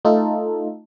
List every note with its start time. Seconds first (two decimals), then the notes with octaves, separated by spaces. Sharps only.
0.05 A3 D#4 F4 A4